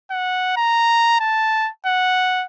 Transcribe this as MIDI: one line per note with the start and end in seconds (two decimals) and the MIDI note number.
0.11 0.55 78
0.57 1.19 82
1.20 1.70 81
1.86 2.46 78